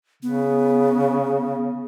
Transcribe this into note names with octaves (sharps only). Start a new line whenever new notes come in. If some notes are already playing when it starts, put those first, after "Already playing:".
C#3 B3